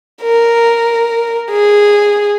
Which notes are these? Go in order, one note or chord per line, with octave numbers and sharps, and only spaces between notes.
A#4
G#4